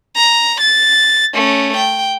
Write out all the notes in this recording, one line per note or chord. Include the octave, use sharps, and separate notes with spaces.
A#5
A6
A3 C#4
G5